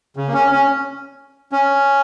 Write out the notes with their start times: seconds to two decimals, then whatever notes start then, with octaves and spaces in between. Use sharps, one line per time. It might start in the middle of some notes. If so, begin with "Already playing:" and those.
0.16 C#3
0.28 A#3
0.33 C#4
0.52 C#4
1.52 C#4